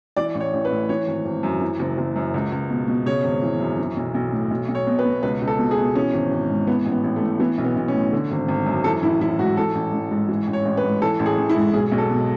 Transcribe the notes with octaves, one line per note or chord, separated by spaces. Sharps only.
E3 D5
A1
C#5
A1
B4
A2
E3 C#5
G#1
G#1
F#2
E3
F#1
F#1
F#2
C#2
C#2
B2
B2
C#3 C#5
G#1
E3
F#2
E3
B1
B1
A2
B1
B1
C#5
B2
B4
B2
C#2 B4
C#2
A4
B2
G#4
B2
E3 C#4
G#1
G#1
G#2
E3 B3
A1
B3
A1
A3
A2
E3 B3
B1
B3
B1
C#4
A2
D3
G#1
G#1
F#2
E3 A4
A1 E4
A1 E4
G#2 F#4
E3 A4
A1
A1
G#2
E3
A1
C#5
A1
B4
G#2
E3 A4
A1
G#4
A1
E4
G#2
B1 G#4
B1
A4
B2